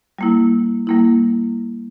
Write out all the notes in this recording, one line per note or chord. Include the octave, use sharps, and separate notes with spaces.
G3 A#3 E4
G3 A#3 E4